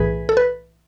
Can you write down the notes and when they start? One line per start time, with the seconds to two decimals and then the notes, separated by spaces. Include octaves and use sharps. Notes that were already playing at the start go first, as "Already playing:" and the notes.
Already playing: B1 A2 E3 G#4 B4
0.29 A4
0.37 B4